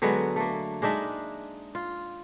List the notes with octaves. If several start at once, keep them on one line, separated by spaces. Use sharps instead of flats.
D3 F#3 G#3 B3
A3 A#3
G#3 D4 D#4 E5
F4